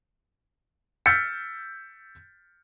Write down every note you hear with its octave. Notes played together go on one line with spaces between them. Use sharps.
E6 F6 G6 A6 B6 C#7